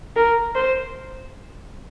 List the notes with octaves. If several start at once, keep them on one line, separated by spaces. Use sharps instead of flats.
A#4
C5